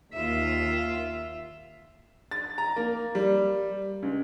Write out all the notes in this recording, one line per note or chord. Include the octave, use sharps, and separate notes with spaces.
D#2 F4 E5
A6
A#5
A#3
G3
C#2